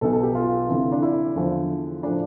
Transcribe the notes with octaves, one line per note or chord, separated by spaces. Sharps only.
B1 B2 A4
A4
G4
F4
D2 C3 E3
D4
E4
E2 D3 F3
A2 F3 D4